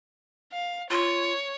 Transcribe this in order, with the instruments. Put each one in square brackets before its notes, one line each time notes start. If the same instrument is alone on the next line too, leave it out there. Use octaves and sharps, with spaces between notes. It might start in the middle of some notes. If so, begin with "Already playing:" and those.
[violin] F5
[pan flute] F4 [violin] C#5